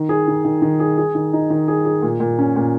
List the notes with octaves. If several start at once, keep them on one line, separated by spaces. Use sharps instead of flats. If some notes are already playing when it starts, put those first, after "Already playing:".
Already playing: D#3
G#4
D#3
D#3
D#3
G#4
G#4
D#3
D#4
D#3
G#4
G#4
A#2
A#2
C#4
A#2